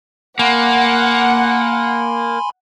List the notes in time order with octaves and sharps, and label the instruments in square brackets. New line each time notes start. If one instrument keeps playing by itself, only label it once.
[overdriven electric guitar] A#3 [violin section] F#5 [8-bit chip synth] G#5 B5 C6